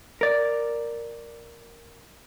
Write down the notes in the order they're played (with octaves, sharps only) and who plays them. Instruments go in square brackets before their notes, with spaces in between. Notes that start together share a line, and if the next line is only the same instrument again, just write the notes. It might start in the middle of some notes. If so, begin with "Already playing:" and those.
[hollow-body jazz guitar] A#4 D5